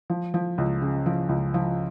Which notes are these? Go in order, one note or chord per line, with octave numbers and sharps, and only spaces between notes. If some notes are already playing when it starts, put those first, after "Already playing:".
F3
F3
C#2
C#3
F3
C#2
F3